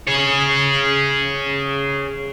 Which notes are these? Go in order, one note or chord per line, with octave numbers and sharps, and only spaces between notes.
G#4 C#5